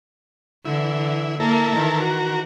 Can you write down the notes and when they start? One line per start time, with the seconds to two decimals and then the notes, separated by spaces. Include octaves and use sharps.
0.65 D3 E3 E4
1.40 A#3 E4 A4 A#4
1.70 D#3 E3
2.00 F#4 A#4